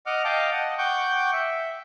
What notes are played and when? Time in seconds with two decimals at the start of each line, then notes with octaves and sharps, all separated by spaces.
0.06 D#5 F#5 D6 F6
0.24 D#5 F5 G5 A5 D6
0.52 D#5 F#5
0.78 F#5 G5 C#6 D6 G6
1.33 E5